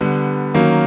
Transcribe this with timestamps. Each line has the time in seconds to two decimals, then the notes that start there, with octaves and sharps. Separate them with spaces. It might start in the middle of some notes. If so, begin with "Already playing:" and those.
0.01 D3 G3 B3
0.54 D#3 F#3 A#3 C#4